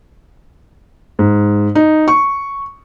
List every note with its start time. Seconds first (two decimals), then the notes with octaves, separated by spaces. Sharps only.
1.19 G#2
1.75 D#4
2.08 C#6